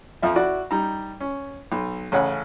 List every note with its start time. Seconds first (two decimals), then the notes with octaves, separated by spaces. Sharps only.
0.22 F2 F3 E5
0.36 E4 F#4 D5
0.71 G3 D#4 A#5
1.20 C#4
1.72 B1
2.12 A1 C#3 C#5 F#5